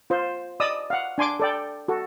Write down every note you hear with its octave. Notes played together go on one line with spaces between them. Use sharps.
F4 C5
D5 D#5 D#6 E6
F5 F#5
D4 G#5 C6 D6
A4 D5 G5
F#4 A4